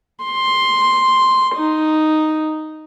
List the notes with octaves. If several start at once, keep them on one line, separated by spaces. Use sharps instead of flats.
C6
D#4